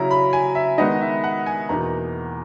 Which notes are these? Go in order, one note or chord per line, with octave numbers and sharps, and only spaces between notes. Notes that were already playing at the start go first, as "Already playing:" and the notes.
Already playing: C#3 F#3 C#4 E4 A#5
B5
G#5
E5
D#3 G#3 B3 D#4 D#5
E5
F#5
G#5
E2 B2 A#3 D#4 A#5